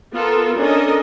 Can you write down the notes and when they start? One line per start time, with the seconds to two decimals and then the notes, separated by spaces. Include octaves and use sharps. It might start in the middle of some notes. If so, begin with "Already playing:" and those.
0.14 B3 F4 A4 A#4
0.57 C#4 D4 A4 A#4 D#5